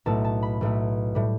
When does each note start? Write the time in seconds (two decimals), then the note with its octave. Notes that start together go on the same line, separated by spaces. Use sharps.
0.06 B1 A2 A3 A5
0.24 A5
0.43 B5
0.61 B1 A2 A3
1.15 A2 G3